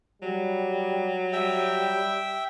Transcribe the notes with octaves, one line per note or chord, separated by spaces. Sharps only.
F#3 G3
G3 E5 G5